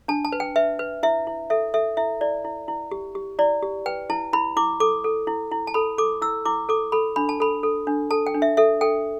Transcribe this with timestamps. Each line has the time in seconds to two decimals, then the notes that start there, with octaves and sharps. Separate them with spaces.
0.08 D4 A5
0.25 A5
0.32 B4
0.40 G5
0.56 B4 E5
0.79 B4
1.03 E4 E5
1.27 E4
1.50 A4 E5
1.74 A4 E5
1.97 E4 E5
2.21 E4 D5
2.44 E4
2.68 E4
2.91 G4
3.15 G4
3.39 E4 D5
3.62 G4
3.86 B4 G5
4.10 E4 A5
4.33 E4 B5
4.57 E4 D6
4.80 A4 D6
5.04 A4
5.27 E4
5.51 E4
5.67 A5
5.74 A4 B5
5.98 A4 D6
6.22 E4 E6
6.46 E4 D6
6.69 A4 D6
6.92 A4 B5
7.16 D4 B5
7.29 A5
7.40 A4 B5
7.63 A4
7.87 D4
8.11 A4 A5
8.26 G5
8.34 D4
8.42 E5
8.57 A4 E5
8.81 A4 G5